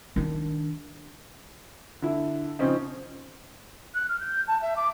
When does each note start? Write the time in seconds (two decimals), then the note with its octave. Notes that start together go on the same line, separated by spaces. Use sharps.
0.16 D#3 D4
2.02 D3 E4
2.59 C#3 F3 C4 C#4 D#4
3.94 F#6
4.09 F6
4.20 G6
4.48 A5
4.62 E5
4.76 D6